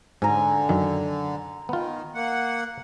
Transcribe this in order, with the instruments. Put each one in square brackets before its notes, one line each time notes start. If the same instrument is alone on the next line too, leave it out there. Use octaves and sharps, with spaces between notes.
[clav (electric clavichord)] G#2 [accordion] D3 [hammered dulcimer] G#5 A#5
[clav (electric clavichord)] F#2 D#3
[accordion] D#3 [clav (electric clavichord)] B3 F4
[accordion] A#3 F#5